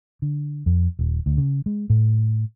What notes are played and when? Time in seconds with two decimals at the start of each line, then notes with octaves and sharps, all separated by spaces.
0.22 D3
0.66 F2
0.99 D#1
1.26 D2
1.38 C#3
1.66 G#3
1.90 A2